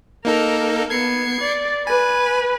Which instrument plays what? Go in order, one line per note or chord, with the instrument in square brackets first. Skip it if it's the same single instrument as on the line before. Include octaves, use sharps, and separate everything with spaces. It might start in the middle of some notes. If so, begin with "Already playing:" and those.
[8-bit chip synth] A#3 D#4 A4 [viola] A#4
[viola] B3 [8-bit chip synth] G#6 C7 C#7
[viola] D5
[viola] B4 [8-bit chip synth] G#5